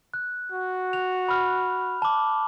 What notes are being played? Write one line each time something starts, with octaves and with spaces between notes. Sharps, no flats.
F#6
F#4
F7
B5 F6
A5 D6